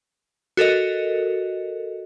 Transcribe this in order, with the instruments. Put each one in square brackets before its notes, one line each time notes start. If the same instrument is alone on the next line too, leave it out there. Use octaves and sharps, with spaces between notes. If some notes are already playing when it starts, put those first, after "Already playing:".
[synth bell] F#4 A4 A#4 D#5